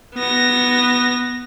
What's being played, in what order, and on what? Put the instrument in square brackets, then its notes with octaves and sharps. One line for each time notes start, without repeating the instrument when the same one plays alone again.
[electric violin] B3 A#6